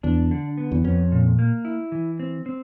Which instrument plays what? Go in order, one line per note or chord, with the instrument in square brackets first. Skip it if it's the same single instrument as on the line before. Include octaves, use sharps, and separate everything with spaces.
[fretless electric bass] E2 [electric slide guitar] D4
[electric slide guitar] D3
B3
[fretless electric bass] E2
[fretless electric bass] F2 [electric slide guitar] C#4
[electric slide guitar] A#2
A#3
E4
E3
C4
C4